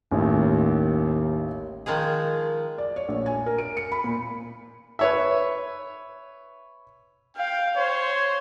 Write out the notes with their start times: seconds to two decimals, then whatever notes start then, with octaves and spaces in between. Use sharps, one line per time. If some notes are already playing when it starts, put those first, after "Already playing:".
0.11 A1 D#2
1.86 D#3 F3 G#3 G#4
2.78 D5
2.96 C#5
3.09 A#1
3.26 G#5
3.46 A#4
3.58 D7
3.77 C#7
3.92 B5
4.04 A#2
4.99 B4 C#5 E5
7.37 F5 G5
7.77 C5 C#5